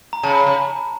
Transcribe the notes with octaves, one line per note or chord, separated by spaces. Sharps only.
A#5
C#3 A5
C#3